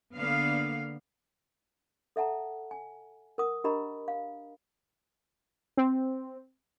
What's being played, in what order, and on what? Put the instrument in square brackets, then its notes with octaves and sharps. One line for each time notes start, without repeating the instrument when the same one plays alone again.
[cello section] D3 A#3 B3 F5
[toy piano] A4 E5 F#5 A5 A#5
G#5
A#4 F#5 D#6
D4 G4 A#4 D#5 A#5 B5
F5
[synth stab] C4